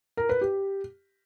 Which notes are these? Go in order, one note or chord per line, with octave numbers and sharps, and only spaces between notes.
A#4
B4
G4